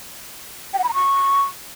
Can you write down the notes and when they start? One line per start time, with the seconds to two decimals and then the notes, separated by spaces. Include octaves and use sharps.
0.74 G5
0.79 F#5
0.84 B5
0.89 A#5
0.94 C#6